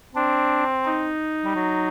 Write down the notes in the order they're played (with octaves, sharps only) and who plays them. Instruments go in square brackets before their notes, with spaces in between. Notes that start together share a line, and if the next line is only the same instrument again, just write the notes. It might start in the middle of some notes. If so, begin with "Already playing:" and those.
[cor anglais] C4 [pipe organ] D4
[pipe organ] D#4
[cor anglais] G3
F#3